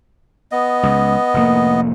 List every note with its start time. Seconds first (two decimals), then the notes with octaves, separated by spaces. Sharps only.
0.52 B3 D#5
0.83 C#2
1.34 F1 A2 A#3